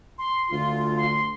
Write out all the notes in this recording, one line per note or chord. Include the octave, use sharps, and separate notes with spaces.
C6
D2 F4
C6